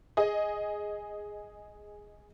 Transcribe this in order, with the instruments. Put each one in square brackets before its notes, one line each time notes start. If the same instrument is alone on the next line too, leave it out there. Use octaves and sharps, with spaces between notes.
[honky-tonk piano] G#4 D#5